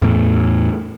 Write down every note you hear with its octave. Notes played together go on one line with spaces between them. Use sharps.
E2 A2 A3